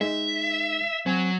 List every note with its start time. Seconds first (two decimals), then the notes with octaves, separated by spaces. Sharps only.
0.01 G#3 D#4 E5
1.06 F#3 C4 G#5